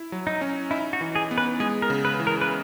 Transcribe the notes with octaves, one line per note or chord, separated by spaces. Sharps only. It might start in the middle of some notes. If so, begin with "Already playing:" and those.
Already playing: E4
F#3
D#4
C#4
D#4 E4
F#4
E3
G#4
B3
B4
G#3 G#4
A#4
C#3
B4
E3
A#4
B4